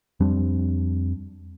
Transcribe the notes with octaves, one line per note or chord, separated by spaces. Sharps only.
F2 G3 C4 D4